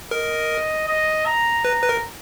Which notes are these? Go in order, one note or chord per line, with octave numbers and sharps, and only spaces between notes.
A#4 D#5
D#5
A#5
B4 A#5
B4
A#4